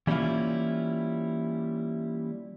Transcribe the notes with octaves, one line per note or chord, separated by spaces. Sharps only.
E3 G3 A#3 C#4 E4 F4